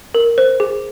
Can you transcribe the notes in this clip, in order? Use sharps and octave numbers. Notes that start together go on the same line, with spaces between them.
A#4
C5
G#4